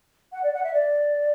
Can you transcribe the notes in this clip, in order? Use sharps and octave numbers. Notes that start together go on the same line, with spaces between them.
F#5
D5
F#5
E5
D5